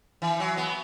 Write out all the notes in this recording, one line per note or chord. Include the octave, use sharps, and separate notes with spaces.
E3
F#3
B3